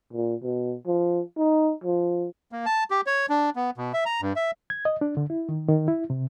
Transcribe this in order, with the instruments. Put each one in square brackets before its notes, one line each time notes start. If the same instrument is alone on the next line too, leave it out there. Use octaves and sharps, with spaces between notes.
[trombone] A#2
B2
F3
D#4
F3
[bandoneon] A#3
A5
G4
C#5
D4
B3
B2
E5
A#5
G2
E5
[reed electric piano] G#6
D#5
D4
D3
E4
D#3
D#3
E4
C3